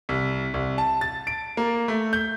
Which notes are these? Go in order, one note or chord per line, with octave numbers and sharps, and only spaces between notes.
C2
C2
A5
A6
D7
A#3
A3
G6